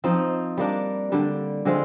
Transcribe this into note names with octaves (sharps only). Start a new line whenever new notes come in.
F3 C4 D#4
G3 A#3 D4
D3 G3 D4
D3 G#3 C4 F4